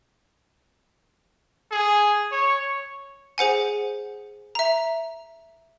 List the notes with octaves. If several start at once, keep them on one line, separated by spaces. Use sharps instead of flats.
G#4
C#5
G#4 C5 F#5 G#5
E5 A#5